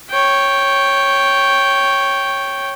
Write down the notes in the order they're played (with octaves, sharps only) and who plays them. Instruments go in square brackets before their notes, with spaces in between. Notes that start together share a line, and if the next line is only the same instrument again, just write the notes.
[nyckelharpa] C#5 G5